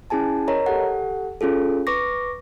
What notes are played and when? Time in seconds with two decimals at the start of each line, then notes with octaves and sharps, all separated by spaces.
0.10 C#4 E4 G#4 G#5 A5
0.48 A#4 C#5 D#5 A#5
0.66 G4 A4 F#5
1.41 C#4 F4 G#4 A4
1.87 B4 C#6 D6 A#6